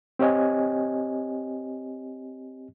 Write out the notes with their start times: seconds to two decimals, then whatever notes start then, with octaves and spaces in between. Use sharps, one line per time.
0.19 C4 G4 C#5 D#5 G#5